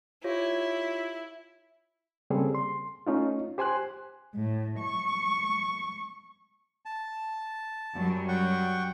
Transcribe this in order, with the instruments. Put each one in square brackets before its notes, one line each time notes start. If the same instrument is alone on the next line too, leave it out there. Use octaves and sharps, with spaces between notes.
[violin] E4 [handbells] F4 G4 C#5
[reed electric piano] C#3 G3 A#3 C4 G#4 A4
C6
A3 C#4 D#4 F4
G4 C5 G#5 C6 F#6
[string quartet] A2
C#6
[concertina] A5
[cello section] F#2 F#3 G3
[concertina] F#5 G5 C#6